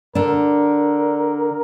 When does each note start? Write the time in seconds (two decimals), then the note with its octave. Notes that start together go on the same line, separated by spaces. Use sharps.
0.15 D3 D4 A#4